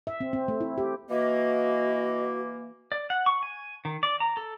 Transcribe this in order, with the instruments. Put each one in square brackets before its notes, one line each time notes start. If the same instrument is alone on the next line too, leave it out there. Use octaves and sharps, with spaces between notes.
[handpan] E5
C4
C4
A3
E4
G4
[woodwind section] E3 A#3 [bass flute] F#4 [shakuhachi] D#5
[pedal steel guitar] D5
F#5
C#6
G#5
D#3
D5
A#5
A4